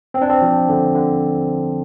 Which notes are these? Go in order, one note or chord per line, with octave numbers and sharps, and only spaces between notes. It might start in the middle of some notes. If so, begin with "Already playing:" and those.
C4
D4
C4
F3
D3
D3